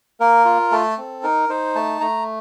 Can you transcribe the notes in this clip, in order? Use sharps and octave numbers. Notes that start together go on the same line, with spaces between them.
A#3 A#4
F4
A3 A4
C4
D#4 A#4
D#4 C5
A3 A5
A3 A#5